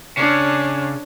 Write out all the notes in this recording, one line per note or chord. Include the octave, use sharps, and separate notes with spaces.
C#3 D4 C#5